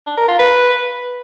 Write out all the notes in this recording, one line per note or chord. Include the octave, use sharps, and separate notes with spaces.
D4
A#4
F4
B4